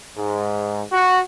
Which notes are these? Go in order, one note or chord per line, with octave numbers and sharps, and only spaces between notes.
G#2
F#4